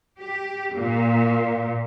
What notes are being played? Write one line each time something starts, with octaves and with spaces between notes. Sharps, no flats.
G4
A#2